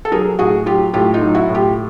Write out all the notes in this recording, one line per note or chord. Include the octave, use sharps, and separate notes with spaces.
A4
F#3 G#4 A#4
A2 F#4 G#4
F#3 F4 G4
A2 F4 G4
D#4 F4
F#3
E4 F#4
A2
F4 G4